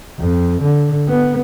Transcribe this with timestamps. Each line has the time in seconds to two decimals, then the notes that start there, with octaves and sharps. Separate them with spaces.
0.19 F2
0.62 D3
1.08 B3